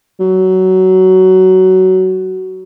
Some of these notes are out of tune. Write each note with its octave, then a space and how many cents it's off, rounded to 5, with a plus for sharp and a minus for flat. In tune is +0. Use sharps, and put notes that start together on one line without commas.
F#3 +15